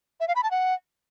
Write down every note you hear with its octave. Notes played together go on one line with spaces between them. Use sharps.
E5
F5
B5
A5
F#5